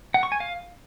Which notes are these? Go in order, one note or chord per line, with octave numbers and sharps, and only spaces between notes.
F#5
C#6
G#5
F5